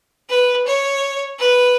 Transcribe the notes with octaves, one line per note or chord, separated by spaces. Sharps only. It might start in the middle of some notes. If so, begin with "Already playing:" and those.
B4
C#5
B4